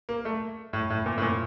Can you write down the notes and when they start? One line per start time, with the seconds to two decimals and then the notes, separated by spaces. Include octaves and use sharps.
0.09 A#3
0.25 A3
0.73 A2
0.90 A2
1.06 A#2
1.18 A2
1.22 A#2